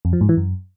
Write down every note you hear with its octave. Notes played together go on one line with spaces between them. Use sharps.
F2
F3
G#2
E3
F#2